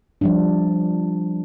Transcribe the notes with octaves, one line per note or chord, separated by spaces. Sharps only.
F3 G3 D4